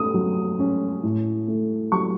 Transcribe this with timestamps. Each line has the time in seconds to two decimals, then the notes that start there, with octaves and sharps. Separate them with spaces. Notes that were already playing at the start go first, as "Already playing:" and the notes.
Already playing: A3 D#6
0.14 F#3
0.59 C#4
1.03 A2
1.48 A3
1.92 F#3 C#6